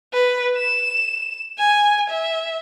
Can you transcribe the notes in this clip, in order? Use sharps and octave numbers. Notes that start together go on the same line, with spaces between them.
B4
E7
G#5
E5